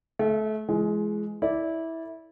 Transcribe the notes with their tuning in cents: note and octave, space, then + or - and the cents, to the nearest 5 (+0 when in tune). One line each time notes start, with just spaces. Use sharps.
A3 -30 E5 +35
E3 +45 G#3 +15
E4 -15 A4 +15 D5 -10